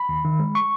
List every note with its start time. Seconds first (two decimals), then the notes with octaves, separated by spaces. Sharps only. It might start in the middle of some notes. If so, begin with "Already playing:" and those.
Already playing: B5
0.09 D#2
0.25 D#3
0.40 G#3
0.55 C#6